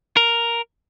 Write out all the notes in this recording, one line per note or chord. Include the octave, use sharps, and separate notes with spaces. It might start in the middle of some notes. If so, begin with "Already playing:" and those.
A#4